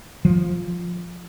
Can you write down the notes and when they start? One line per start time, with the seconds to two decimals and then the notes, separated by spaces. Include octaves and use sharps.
0.25 F3